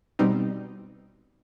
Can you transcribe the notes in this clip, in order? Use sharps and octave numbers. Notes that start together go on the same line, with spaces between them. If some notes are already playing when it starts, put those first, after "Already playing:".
B2 G3 C4 D#4